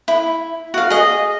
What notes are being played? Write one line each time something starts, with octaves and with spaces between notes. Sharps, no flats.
E4
F#4 F5
G#4 D#5